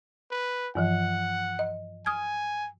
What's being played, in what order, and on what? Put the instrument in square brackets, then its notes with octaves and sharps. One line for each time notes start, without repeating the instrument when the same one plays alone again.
[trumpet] B4
[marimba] G2 E3 F3 [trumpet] F#5
[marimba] D#5
[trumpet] G#5 [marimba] D#6 F6 G#6